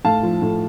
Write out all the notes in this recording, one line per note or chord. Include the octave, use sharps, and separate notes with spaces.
A2 F5 A5
F3
A2